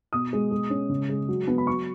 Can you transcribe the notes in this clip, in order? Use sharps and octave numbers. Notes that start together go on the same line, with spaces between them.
B2 D#6
G#3
G#3
C#4
C#3
G#3
F#3
B3
B5
F#3 C#6